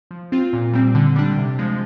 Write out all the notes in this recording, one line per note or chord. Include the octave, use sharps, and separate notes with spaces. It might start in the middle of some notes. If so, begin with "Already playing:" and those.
F3
C4 F4
A#2
G3 C4
D3
G3 D4
C3
F3 G#3